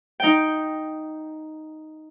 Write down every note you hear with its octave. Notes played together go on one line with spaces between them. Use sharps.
D#4 G5